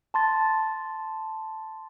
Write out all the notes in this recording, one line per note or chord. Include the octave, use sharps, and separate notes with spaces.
A5 C6 A6